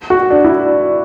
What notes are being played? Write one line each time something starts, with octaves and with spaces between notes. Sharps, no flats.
F#4
D4
E4